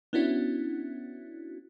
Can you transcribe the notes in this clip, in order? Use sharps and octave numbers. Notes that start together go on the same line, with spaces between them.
B3 C#4 D4 E4 F#4